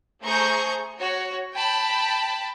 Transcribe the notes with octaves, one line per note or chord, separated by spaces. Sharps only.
A3 G#4 C5 A#5 C#6 G6
F#4 C#5
G5 A5 B5